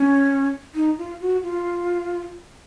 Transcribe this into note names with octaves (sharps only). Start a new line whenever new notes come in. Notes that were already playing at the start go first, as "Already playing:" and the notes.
Already playing: C#4
D#4
F4
F#4
F4